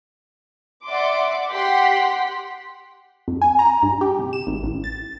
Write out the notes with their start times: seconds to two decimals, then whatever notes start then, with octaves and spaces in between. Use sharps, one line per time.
0.86 D5 E5 F#5 C6 D6
1.50 G4 F#5 G5 C6 B6
3.28 F2
3.42 G#5
3.59 A#5
3.83 G2
4.01 G4
4.19 C3
4.33 E7
4.47 G#1
4.63 A1
4.84 A6